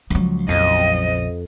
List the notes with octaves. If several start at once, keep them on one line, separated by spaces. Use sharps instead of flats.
C#2 F3 F#3
A#1 F2 C#3 D#5